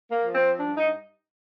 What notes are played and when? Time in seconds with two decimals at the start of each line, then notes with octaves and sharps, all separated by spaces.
0.11 A#3
0.22 F3
0.35 C4
0.59 G2 D4
0.77 D#4